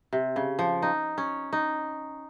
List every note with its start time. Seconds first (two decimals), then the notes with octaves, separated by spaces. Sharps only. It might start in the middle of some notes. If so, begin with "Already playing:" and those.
0.13 C3
0.36 C#3
0.59 F3
0.82 D#4
1.18 C#4
1.53 D#4